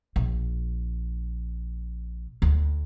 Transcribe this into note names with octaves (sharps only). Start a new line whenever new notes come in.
A#1
D2